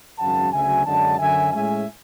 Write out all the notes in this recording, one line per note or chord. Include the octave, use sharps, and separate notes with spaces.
G#1 F#2 C#3 F#3 C#4 F#5 A5
D2 C#3 F#3 E5 G#5
F#2 D3 G#3 D4 F#5 A5
F#2 D3 F#3 E5 G#5
A2 G#3 C#4 E5 G#5